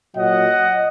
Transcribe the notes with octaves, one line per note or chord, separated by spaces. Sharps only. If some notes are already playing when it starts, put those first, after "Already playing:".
A#2 F#3 D#5 F#5